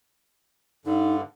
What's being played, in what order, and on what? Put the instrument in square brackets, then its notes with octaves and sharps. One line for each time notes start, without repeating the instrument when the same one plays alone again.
[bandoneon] G2 D3 [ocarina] D#4